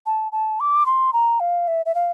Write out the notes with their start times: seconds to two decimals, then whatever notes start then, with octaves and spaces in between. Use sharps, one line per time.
0.06 A5
0.32 A5
0.60 D6
0.86 C6
1.13 A#5
1.40 F5
1.68 E5
1.86 E5
1.95 F5